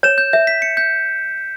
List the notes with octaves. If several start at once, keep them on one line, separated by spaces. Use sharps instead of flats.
C#5 E7
G6
E5 G6
B6
C#7
G6